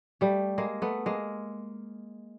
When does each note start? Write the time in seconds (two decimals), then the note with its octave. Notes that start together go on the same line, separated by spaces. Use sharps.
0.21 G3 A3
0.58 G#3 A#3
0.82 A3 B3
1.06 G#3 A#3